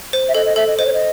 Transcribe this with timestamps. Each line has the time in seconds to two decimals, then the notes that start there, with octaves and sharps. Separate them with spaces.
0.13 C5
0.28 E5
0.35 A4 D#5
0.46 D#5
0.56 A4 E5
0.67 D#5
0.78 C5 D#5
0.86 C#5
0.93 D#5